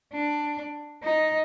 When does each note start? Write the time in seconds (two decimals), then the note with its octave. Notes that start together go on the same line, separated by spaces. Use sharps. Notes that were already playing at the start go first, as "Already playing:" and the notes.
0.13 D4
1.03 D#4